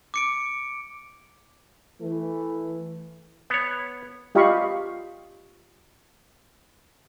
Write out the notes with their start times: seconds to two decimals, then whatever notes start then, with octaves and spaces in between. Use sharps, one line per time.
0.14 D6 C#7 D7
2.01 E3 A3
3.50 B3 C#5
4.35 F4 G4 D#5 F5 B5 C#6